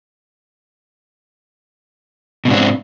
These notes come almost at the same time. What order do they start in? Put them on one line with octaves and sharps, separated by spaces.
B2 G#2 D4 C4